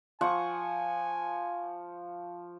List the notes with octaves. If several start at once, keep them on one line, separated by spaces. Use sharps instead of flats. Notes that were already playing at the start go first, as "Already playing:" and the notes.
F3 F#5 G#5 C#6